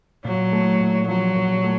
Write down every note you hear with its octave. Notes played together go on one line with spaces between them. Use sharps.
A#2 F#3
A3
A#2
F3 F#3
A#2
A3